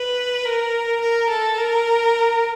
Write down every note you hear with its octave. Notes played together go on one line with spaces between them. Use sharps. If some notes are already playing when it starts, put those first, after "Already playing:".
Already playing: B4
A#4
A#4
A4
A#4